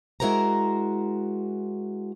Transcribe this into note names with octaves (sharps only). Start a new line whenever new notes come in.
G#3 E4 F#4 A#4 C5 A#5